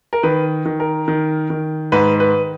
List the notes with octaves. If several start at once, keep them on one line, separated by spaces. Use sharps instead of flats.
A#4
D#3 B4
D#3
A#4
D#3
D#3
G#2 B4
B4